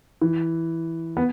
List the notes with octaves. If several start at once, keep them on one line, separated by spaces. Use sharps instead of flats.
E3
B3